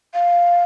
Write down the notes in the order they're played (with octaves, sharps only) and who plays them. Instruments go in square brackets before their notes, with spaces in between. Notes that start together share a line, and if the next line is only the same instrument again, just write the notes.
[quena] F5